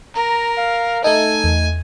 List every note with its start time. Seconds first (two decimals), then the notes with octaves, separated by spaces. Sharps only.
0.16 A#4 A#5
0.58 F5
1.04 A3 D#4 A4 G#5
1.44 E2